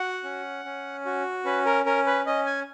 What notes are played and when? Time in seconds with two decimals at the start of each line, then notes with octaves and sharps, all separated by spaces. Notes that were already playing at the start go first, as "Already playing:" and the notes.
Already playing: F#4 F#5
0.24 C#4
0.65 C#4
1.05 F#4
1.45 C#4 B4
1.66 A#4
1.86 C#4 A#4
2.06 B4
2.26 C#4 D#5
2.46 G#5